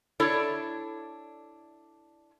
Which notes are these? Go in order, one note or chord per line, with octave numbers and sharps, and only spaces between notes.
D4 E4 A4 C#5 D5